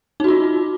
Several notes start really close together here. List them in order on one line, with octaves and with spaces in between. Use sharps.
D#4 F#4 F4